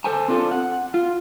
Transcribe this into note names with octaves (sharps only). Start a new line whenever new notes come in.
A4 C5 G#5 A5
C4 D4 F4 G4 A4
F#5
F4